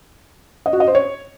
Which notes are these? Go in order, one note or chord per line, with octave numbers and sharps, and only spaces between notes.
D#5
F#4
D#5
C5
C#5